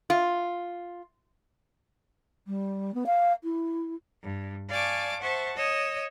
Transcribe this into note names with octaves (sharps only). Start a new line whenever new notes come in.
F4
G3
B3
F5
E4
G2
D5 F5 G#5 A5 C#6 D6
C5 E5 F#5 A5 C#6
C#5 D#5 D#6 E6